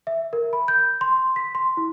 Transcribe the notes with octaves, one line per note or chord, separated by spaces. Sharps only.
E5
A#4
B5
G6
C6
B6
C6
E4